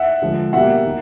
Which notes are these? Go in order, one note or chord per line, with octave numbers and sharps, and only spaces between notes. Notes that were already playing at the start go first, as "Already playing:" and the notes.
Already playing: E5 F#5
D3 F3 G#3
B2 G3 A#3 E5 F#5
D#3